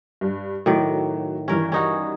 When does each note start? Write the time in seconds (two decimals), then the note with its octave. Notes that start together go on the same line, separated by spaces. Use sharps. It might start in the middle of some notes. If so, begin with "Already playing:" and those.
0.21 G2
0.66 A2 D#3 F#3 D5
1.48 G2 D#3 E3 C#4 A#4
1.72 C#4 D#4 F#4